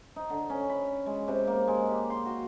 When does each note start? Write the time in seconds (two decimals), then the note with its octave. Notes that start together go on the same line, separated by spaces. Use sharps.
0.16 D#4
0.30 D3
0.50 C#4
0.69 B5
1.06 G#3
1.28 C3
1.47 A#3
1.67 G#3
1.89 G4
2.10 C6
2.25 F#4